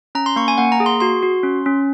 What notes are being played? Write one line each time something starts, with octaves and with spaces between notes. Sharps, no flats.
C#4 A#5
C6
A#3 C#6
G#5
A#3 F#5
A#5
G#4
C6
F#4 C6
F#4
C#4
C#4